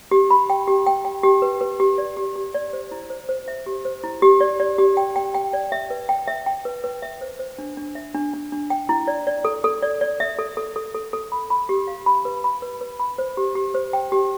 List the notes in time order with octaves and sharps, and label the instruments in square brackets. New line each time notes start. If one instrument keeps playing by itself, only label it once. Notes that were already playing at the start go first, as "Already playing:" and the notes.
[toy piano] G4
B5
G5
G4
G5
G5
G4
B4
B4
G4
D5
G4
G4
D5
C5
E4
C5
C5
E5
G4
C5
E4
G4
D5
D5
G4
G5
G5
G5
D5
E5
B4
G5
E5
G5
B4
B4
E5
C5
C5
D4
D4
E5
D4
D4
D4
G5
E4
D5
D5
A4
A4
D5
D5
E5
A4
A4
A4
A4
A4
B5
B5
G4
F5
B5
B4
B5
B4
B4
B5
C5
G4
G4
C5
G5
G4